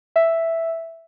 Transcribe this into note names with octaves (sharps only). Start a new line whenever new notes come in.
E5